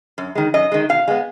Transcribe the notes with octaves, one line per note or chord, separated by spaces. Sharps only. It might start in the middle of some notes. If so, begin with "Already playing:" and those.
F#2
D#3 G#3
F#2 D#5
D#3 G#3
B2 F5
G#3 B3